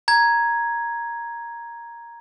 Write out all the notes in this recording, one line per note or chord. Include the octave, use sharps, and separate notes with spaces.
A#5 G#6